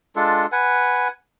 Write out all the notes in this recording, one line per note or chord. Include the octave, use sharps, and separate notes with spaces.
G#3 D4 F4 A4
B4 F#5 G#5